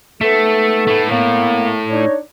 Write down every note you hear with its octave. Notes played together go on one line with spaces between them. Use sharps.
A3 B3 D#4 A4
A3 E4
A2 A#3 B3
D4 D#4 C#5